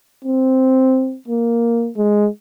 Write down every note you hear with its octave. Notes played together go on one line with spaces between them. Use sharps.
C4
A#3
G#3